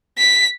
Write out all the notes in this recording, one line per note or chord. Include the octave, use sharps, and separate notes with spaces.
B6